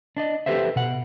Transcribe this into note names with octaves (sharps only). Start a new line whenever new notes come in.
D4 D5 D#5
G4 A4 B4 C5 E5
B2 F#5